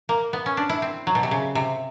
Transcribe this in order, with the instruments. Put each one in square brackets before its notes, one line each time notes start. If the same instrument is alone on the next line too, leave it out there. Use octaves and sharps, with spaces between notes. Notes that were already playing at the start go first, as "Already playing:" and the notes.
[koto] A#3
B3
C#4
D4
E4
C4
F#3
B2
C3
C#3
C3